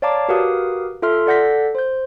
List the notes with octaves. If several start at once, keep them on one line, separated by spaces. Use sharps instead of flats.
C#5 D5 F5 A5 A#5 D6
F#4 G4 A#4 B4 F5 D#6
F4 A4 E5 C6 F6
A4 D5 F#5 G6 A#6 B6
C5 G6